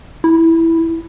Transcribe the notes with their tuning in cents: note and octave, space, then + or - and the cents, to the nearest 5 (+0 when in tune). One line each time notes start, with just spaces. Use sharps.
E4 +0